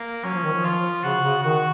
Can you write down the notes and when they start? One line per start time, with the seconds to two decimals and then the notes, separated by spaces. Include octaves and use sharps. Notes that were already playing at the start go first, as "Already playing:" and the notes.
Already playing: A#3
0.24 F#3 C#4
0.34 F3
0.44 D#3
0.53 F3
0.65 F4
1.04 C#3 F#4
1.23 C#3
1.43 D#3 F#4